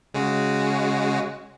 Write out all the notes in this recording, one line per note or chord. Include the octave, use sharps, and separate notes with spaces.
C#3 G#3 F#4